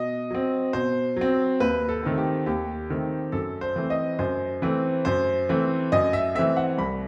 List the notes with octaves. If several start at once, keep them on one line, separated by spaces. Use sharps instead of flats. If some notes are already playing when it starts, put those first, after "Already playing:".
Already playing: B2 D#5
F#3 C4
B2 C5
F#3 C4
D#2 B4
A4
D#3 A3 C4
G4
D#2 G4
D#3 A3 C4
F#2 A4
C5
E3 A3 C4
D#5
F#2 C5
E3 A3 C4
F#2 C5
E3 A3 C4
F#2 D#5
E5
E3 A3 C4 E5
F#5
C2 B5